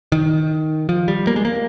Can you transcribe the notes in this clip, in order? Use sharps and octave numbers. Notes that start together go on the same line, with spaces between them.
D#3
F3
G3
A#3
G#3
A#3